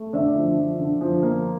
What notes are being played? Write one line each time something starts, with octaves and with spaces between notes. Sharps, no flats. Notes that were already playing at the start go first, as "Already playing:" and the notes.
Already playing: A3
D3 D5 E5
F3
F3
D3
F3
A#3